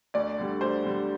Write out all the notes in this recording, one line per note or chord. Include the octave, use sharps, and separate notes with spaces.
D2 D5
D3 G3
D2 C5
D3 G3